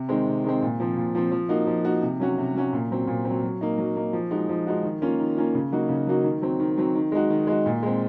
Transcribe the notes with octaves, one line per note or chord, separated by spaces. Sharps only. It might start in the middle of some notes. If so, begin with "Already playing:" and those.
Already playing: C3
D#3 G#3 C4
C3
D#3 G#3 C4
A#2
F3 C4
A#2
F3 C4
F3
A#3 D#4 F#4
F3
A#3 D#4 F#4
C3
F#3 C#4 F#4
C3
F#3 C#4 F#4
A#2
F#3 C4
A#2
F#3 C4
F#3
A#3 D#4
F#3
A#3 D#4
F3
G#3 D#4 F#4
F3
G#3 D#4 F#4
D#3
A#3 C#4 F4
D#3
A#3 C#4 F4
C#3
F#3 A#3 D#4 F#4
C#3
F#3 A#3 D#4 F#4
D#3
F#3 C4
D#3
F#3 C4
D#3
G#3 D#4 F#4
D#3
G#3 D#4 F#4
A#2
G#3 C4